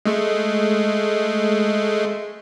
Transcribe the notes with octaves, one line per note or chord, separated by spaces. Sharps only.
G#3 A3